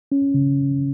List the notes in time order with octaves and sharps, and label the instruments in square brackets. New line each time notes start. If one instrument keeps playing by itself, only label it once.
[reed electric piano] C#4
C#3